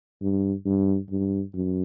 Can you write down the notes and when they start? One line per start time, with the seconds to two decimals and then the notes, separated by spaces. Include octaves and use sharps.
0.22 G2
0.65 G2
1.10 G2
1.54 F#2